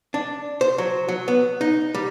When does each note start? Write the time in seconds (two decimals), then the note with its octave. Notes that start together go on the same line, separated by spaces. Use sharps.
0.14 D4
0.61 C5
0.78 F#3
1.09 F#3
1.28 B3
1.61 D#4
1.95 G3